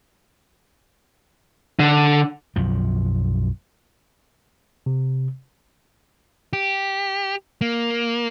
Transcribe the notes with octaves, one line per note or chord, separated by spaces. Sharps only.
D3
B1 F#2 F3
C3
G4
A#3